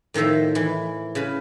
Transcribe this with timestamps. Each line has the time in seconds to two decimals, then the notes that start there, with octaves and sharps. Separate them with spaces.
0.14 A2 D#3 F3 E5 A#5
0.55 E3
1.15 C#3 B4 B5